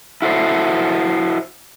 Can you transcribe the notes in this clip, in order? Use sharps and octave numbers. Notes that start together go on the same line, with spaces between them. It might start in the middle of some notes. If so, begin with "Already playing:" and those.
E4 F#4 A4 C5